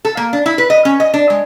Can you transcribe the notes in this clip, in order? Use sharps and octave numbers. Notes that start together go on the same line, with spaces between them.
A4
A#3
D4
E4
B4
D#5
C#4
D#5
D4
G#3